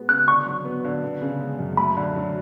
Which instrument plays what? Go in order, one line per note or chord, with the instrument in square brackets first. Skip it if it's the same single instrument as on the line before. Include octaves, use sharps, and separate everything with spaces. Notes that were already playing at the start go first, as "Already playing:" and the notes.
Already playing: [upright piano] G#3 B3 F#4
[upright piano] C#3 [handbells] F#6
[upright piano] D3 [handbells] C#6
[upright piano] F#3
B3
D3
B3
C#3
G#3
F#2
[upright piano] A3 [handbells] B5
[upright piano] D3
F#3